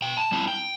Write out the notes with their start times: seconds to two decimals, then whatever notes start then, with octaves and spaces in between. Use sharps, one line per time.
0.02 B2 G5
0.17 A5
0.32 G3 C4 E4 A5
0.48 G5